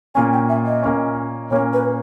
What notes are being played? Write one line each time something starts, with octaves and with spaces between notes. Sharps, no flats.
A#2 A#3 C#4 G#5
G5
E5
D#5
A#2 A#3 C#4
A#2 A#3 C#4 C#5
B4